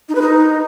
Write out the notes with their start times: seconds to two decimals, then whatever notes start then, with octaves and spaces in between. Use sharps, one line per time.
0.09 D#4
0.15 B4
0.21 D#4